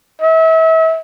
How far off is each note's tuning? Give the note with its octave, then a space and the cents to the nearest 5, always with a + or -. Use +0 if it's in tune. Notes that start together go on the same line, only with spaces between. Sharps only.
E5 -35